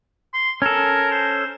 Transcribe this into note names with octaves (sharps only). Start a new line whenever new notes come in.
C6
C#4 A4 A#4
C5